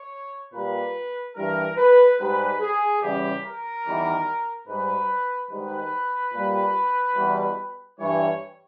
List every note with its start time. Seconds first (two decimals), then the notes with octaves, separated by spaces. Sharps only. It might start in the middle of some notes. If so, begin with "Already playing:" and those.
Already playing: C#5
0.53 A#2 G3 B4
1.36 G2 E3 G3 A#4
1.77 B4
2.19 G#2 G3 B4
2.60 G#4
3.01 E2 C#3 G3 G4
3.43 A#4
3.85 E2 D#3 G3
4.67 G#2 G3 B4
5.50 G#2 D#3 G3 B4
6.32 A#2 G3
7.16 E2 B2 G3
7.99 G2 E3 G3 C#5